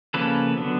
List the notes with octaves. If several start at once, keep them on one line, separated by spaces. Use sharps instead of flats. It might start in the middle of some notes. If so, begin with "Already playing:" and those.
C#3 F3 A#3 C#4 A4 B4
D3 F#3 B3